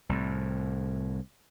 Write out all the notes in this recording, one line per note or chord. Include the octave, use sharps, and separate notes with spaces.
C2 A2